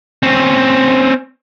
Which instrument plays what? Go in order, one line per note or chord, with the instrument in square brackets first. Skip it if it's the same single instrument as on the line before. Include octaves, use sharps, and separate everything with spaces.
[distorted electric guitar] C4 C#4